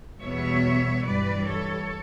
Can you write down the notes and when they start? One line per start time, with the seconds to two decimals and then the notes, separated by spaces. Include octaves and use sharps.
0.20 E2 B2 G3 B3 C#5 E5
1.03 G2 E3 G3 B4 D5
1.46 A4 C#5